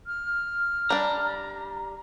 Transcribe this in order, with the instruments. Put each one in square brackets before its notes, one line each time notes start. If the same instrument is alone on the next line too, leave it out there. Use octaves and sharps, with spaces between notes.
[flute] F6
[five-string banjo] G3 D4 [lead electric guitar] A#5